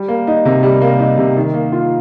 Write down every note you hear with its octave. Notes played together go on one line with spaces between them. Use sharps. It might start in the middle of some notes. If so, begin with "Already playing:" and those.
Already playing: G3
A#3
D#4
C3
G3
A#3
D#4
C3
D#3
A#3
F4